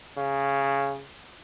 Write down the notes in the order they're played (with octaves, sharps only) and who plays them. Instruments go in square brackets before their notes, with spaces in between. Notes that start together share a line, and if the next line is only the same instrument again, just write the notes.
[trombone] C#3